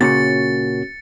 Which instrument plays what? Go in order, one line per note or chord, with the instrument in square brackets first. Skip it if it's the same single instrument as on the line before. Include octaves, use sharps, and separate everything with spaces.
[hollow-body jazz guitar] A#2 C#3 [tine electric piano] F#4 C#5 [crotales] A6 C#7